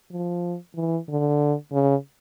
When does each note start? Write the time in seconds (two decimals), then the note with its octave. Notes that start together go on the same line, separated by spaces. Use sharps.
0.12 F3
0.75 E3
1.09 D3
1.72 C#3